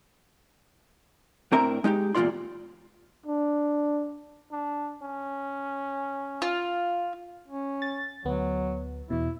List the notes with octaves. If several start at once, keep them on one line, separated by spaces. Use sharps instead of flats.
A2 C4 D4 A#4 E5 A#5
G#3 D#4 F4 G4
E2 A#2 C4 F4 D5 C6
D4
D4
C#4
F4
C#4
A6
D2 F#3 B3
E2 B2 E4